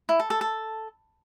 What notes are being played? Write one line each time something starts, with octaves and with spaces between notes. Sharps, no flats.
E4
A4
A4
A4